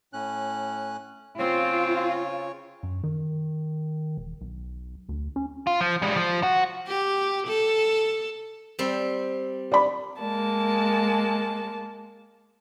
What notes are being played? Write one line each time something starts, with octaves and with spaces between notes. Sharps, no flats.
A2 C#4 F#6
C#3 C4 F4 C#5
F#2
D#3
E1
B1
D2
C#4
F4
F3
G3 G#3
F3
F#4
G4
A4
G3 C4
D5 B5
G#3 A#3 A5